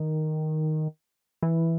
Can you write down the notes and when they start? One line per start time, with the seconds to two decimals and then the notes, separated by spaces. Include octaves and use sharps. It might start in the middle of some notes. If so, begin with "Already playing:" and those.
Already playing: D#3
1.43 E3